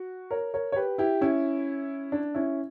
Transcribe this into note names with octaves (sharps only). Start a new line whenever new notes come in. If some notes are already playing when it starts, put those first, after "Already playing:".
Already playing: F#4
A#4 C#5
A#4 C#5
C#5
G4 B4
E4 G4
C#4 E4
D4
C#4 E4